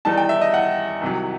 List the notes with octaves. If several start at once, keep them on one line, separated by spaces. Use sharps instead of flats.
E2 D#3 G3 D#4 A5
G5
E5
D#5
F#5
C2 C3 D#3 F#3